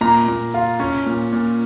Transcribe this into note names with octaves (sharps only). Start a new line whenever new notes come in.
A#2 A#5
A#2
F4
C#4
A#2
A#2